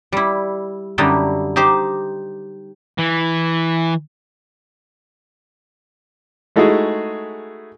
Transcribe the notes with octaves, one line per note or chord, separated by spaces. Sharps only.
G3 E4
F#2 D3 G3 D#4 E4
D#4 G4 C5
E3
G#3 A3 D#4 E4 F#4 G#4